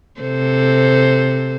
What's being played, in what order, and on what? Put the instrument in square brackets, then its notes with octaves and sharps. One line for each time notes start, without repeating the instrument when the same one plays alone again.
[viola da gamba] C3 A4 C5